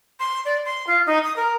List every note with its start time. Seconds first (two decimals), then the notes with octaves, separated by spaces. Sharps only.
0.20 C6
0.45 D5
0.65 C6
0.87 F4
1.06 D#4
1.24 D#6
1.36 A#4